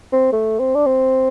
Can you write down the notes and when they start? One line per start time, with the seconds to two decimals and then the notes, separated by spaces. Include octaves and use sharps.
0.12 C4
0.33 A3
0.59 C4
0.75 D4
0.86 C4